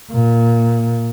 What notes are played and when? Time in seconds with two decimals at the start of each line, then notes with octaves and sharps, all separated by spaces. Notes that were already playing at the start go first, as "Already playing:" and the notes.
0.11 A#2